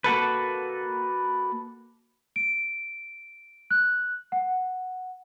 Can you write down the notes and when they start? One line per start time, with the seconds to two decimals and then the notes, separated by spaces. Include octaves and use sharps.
0.04 A#3 F#4 A4 B4
2.36 D7
3.71 F#6
4.32 F#5